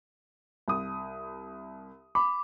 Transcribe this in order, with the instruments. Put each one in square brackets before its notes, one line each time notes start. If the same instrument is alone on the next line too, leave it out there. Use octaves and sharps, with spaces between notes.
[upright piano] C2 D#6
[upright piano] B5 [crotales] D6